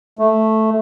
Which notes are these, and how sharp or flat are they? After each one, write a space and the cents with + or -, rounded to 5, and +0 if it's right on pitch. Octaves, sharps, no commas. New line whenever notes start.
A3 -5